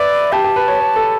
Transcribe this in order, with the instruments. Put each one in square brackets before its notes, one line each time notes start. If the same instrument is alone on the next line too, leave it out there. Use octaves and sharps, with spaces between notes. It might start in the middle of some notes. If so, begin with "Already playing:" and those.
Already playing: [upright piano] B4 E5 [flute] D5
[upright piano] G4 [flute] A5
[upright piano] G4
B4
C#5
C#5
A4